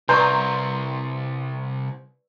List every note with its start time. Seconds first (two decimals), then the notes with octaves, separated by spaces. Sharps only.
0.09 C2 B4 D5 A#5 C6 C#6 G6